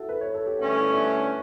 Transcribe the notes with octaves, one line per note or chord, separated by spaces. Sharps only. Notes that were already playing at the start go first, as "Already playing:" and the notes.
Already playing: E4 F#4 A4
B4
C#5
A4
G4
G2 D3 A3 C#4 F#4
E4
D4